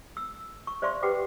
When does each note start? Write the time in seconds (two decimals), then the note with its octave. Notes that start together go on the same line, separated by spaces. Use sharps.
0.17 E6
0.67 C#6
0.82 C5 D5 E5 F5 C6 C#6
1.02 G4 B4 F#5 G5 B5 D6